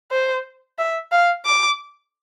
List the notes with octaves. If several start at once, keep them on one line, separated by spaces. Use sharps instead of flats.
C5
E5
F5
D6